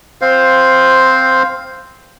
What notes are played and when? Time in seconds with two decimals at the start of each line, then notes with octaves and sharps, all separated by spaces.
0.21 C4 C5 F5